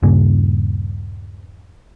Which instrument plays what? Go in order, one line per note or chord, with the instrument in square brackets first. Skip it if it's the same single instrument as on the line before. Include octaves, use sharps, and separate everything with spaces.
[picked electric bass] D#1 G2 C#3 A#3